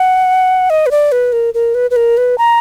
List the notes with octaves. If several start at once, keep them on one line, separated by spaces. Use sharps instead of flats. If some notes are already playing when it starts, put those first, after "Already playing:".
Already playing: F#5
D#5
B4
D5
B4
A#4
A#4
B4
B4
A#4
B4
A#5